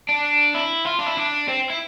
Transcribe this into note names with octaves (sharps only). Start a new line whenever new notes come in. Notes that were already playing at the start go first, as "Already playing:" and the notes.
D4
E4
F4
D4
E4
D4
C4
E4